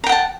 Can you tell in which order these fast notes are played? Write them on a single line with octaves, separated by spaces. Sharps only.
A#5 G5 F#5 A5